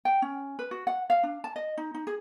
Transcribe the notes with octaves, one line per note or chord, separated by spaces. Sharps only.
G5
C#4
B4
F#4
F#5
F5
D4
A5
D#5
D#4
D#4
G#4